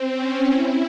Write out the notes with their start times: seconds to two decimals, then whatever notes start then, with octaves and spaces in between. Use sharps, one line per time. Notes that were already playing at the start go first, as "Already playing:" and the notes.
Already playing: C4
0.10 C#4
0.49 E4